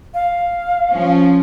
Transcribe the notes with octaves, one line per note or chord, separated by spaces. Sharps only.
F5
F3 C#4